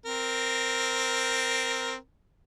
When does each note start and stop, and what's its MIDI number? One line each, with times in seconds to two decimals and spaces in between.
0.06 1.96 60
0.06 1.96 70